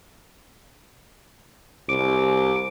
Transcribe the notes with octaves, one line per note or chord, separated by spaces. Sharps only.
C2 D6